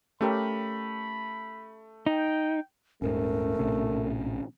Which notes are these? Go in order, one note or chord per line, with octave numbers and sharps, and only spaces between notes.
A3 C#4 G4 A#4 B5
D#4 G5
D#1 G#2 A3 C#4 A#4
A#1 A2 C3